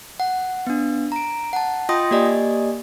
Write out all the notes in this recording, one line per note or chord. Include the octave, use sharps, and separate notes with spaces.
F#5
B3 D4
A#5 D7
F#5 A5
F4 D#5 G5 C6 D#6 A#6
A#3 G4 D5 D#5 G#5